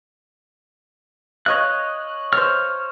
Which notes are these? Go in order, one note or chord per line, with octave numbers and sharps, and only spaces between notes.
C#5 D#5 F5 F#6
C5 C#5 F6